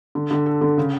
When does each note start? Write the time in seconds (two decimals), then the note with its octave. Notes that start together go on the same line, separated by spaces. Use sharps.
0.15 D3
0.31 D3
0.46 A4
0.61 D3
0.78 C#3